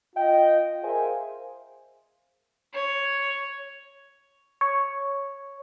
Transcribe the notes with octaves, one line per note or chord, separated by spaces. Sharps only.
F4 D#5 G5
G#4 A#4 C5 E5 F5 G#5
C#5
C#5